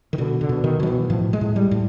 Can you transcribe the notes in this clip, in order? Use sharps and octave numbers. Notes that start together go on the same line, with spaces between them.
D#3
B2 D3
D3
B2
D#3
B2 F3
E3
A2 F3
G#3
A2
G3
A2